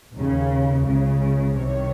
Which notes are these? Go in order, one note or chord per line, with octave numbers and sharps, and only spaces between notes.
D#2 C#3
C#2 C#3
C2 C3 D#3 C#5